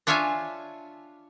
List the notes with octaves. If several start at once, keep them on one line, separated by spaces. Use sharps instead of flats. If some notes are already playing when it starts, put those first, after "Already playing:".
D4 F4 C#5 E5 F5 G#5